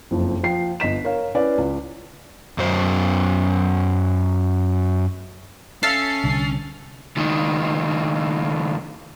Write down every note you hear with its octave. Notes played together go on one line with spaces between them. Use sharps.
F#1 F2
F3 G5 C7
G1 D#5 B6 E7
A#4 C#5 F5
C#4 E4 B4 D5
C#2
F#2 F#3 C5
C#4 A4 E5 F5 A6 C7
C2 D3
C#2 D#3